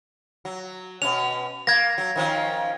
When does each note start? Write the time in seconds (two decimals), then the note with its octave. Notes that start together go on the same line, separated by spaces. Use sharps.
0.45 F#3
1.02 B2 C#4 F7
1.67 A#3 G#6 A#6
1.98 F#3
2.16 D#3 F3 C#4